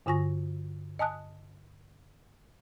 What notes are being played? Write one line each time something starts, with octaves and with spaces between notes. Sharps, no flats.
G2 D3 F4 G#5 C#6 A#6
D#5 G#5 A5 D#6 F#6